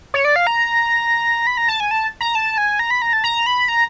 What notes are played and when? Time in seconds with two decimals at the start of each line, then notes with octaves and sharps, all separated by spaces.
0.14 C#5
0.25 D5
0.36 F5
0.47 A#5
1.47 B5
1.57 A#5
1.68 A5
1.80 G#5
1.91 A5
2.21 A#5
2.35 A5
2.58 G#5
2.79 A#5
2.90 B5
3.02 A#5
3.13 A5
3.24 A#5
3.46 B5
3.68 A#5